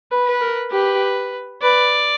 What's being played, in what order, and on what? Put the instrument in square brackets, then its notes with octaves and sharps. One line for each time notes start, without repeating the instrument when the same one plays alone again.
[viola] B4
[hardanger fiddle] B4
[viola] A#4
[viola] G4 [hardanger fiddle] B4
[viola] B4 [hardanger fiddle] D5